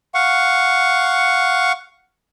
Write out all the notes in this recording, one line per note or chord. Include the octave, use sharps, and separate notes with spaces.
F5 F#5 C#6